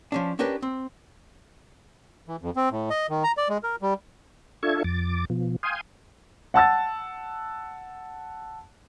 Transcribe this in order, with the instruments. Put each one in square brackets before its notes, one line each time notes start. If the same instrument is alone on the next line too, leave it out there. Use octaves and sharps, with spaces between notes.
[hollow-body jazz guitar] F3 C#4 D4
C#4 D4 G4 A#4 B4
C4
[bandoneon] E3
F2
C4
A2
D#5
D#3
A#5
D5
G#3
A#4
G3
[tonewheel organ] D4 F4 A4 E5 C#6 G#6
F2 D6 A6
B2 F3
F5 G5 G#5 C6 D#6
[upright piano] F#5 A5 E6 A6